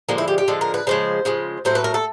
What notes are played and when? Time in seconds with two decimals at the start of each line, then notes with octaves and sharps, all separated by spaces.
0.09 D3 F3 G#3 A#3
0.18 E4
0.28 G4
0.38 G4
0.48 D3 F3 G#3 A4
0.61 A#4
0.74 B4
0.87 C#3 F3 G#3 C5
1.25 C#3 F3 G#3
1.65 A2 F#3 A3 C5
1.75 B4
1.84 A#4
1.94 A4